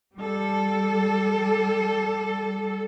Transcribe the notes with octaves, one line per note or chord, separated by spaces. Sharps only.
G3 A4